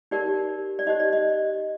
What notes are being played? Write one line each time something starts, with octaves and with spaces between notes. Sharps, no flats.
D#4 G4 A#4 D5
D5
D#4 G4 C5 D#5
D5
D#5